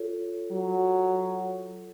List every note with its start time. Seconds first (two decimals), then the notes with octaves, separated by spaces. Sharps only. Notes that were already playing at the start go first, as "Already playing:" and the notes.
Already playing: F4 A4 C#5
0.51 F#3